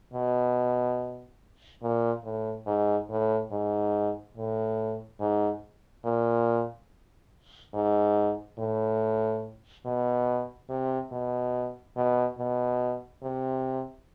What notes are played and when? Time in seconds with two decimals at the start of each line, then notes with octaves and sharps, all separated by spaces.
0.13 B2
1.82 A#2
2.25 A2
2.67 G#2
3.10 A2
3.52 G#2
4.37 A2
5.20 G#2
6.05 A#2
7.74 G#2
8.59 A2
9.86 B2
10.70 C3
11.12 B2
11.97 B2
12.38 B2
13.23 C3